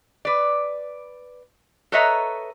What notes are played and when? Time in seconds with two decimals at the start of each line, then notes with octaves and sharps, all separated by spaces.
0.25 B4 D5
1.92 A4 B4 C#5 D#5 E5 A#5